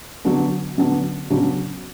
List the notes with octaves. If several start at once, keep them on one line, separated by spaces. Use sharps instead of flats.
D3 F#3 B3 D4
D3 F#3 B3 D4
C#3 F#3 B3 D4 F#4